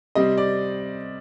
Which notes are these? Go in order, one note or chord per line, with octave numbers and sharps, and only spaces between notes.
C3 G3 C4 D#5
D5